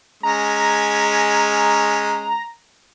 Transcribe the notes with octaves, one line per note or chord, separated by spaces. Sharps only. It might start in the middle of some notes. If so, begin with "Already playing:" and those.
G#3 C#4 A#5